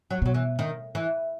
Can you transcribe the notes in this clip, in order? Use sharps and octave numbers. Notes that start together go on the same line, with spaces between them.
F#3
B2 F#3
E3
D#3
E3